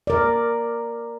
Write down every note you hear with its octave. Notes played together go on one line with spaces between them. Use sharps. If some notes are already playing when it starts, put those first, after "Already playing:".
A#4 D5